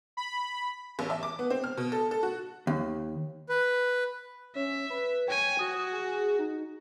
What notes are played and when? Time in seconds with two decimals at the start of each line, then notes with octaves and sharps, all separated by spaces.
0.17 B5
0.99 A1
1.10 E5
1.23 D6
1.39 B3
1.50 C4
1.64 F6
1.77 B2
1.92 A4
2.11 A4
2.23 F#4
2.67 D#2
3.49 B4
4.55 C#4 E5
4.90 B4
5.28 C#5 G5 G#5
5.59 F#4 D#6
5.92 G#4
6.39 D#4